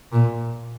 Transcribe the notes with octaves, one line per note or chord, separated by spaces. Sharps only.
A#2